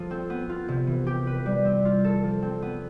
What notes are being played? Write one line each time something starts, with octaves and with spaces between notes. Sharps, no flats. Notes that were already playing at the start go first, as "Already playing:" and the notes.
Already playing: F3 F4 A4
C4
B3
F4
C3
E3
G4
B4
G3
C4
F4
A4
F3
C4
B3